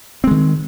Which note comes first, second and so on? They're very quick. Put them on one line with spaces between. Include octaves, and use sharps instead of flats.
C4 G#3 D#3